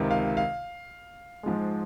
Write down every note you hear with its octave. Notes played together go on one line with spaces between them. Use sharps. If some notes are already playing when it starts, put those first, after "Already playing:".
Already playing: C#2 C3 D#3
F5
F5
G#2 F3 G#3